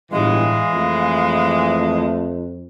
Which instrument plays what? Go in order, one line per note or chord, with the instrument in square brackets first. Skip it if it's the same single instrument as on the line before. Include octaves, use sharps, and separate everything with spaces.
[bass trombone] G1 [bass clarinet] A2 [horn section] E3 G#3 [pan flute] F5
[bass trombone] F2 [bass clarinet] A3